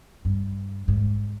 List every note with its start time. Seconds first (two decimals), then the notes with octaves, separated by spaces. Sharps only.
0.25 G2
0.88 G#2